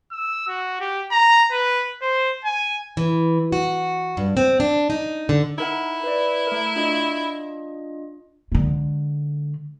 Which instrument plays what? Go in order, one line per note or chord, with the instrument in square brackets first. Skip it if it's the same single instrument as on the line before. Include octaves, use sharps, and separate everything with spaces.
[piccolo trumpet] E6
F#4
G4
A#5
B4
C5
G#5
[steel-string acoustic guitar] E3
F#4
G2
C4
D4
D#4
D3
[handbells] D#4 A#4 F#5 [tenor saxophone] E4
[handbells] B4 D5
A3 A#4
D4 F4 D#5
[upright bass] D3 G#3